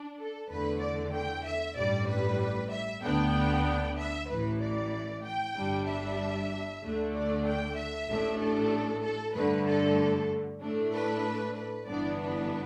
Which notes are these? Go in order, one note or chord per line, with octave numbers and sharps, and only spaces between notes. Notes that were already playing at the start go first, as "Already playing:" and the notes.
Already playing: D4
A4
E2 D3 A3 B4
D5
G5
E5
A1 G2 G3 D5
B4
E5
D2 D3 B3 D4 G5
E5
A1 A2 E3 B4
D5
G5
G1 G2 G3 D4
E5
D2 D3 A3 D4
D5
G5
E5
A1 A2 A3 D4
A4
A4
G2 D3 A3 B4
A4
A2 A3 D4
B4
B4
G1 G2 E3 B3 D4 D5
B4